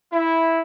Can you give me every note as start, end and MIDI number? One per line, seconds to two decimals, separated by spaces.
0.13 0.60 64